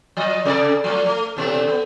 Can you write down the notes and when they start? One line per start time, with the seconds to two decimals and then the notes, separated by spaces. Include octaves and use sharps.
0.17 F3 D#5
0.45 C3 A4 D5
0.84 F3 A3
1.06 A3
1.36 E2 B2 A3
1.68 B3